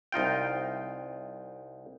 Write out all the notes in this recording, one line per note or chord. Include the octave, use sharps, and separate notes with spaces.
C2 D#4 F4 G5